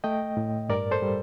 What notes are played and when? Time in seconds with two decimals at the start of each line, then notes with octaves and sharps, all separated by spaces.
0.04 A3 D#5 G5
0.37 A2
0.69 G2 A#4 D5
0.91 A4 C5
1.02 G3